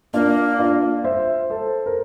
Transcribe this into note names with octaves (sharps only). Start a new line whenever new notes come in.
A#3 D4 F4
D4 F4
C5 E5
A4 C5
A#4